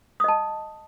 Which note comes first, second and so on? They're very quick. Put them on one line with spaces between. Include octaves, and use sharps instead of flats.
D#6 D#5 A5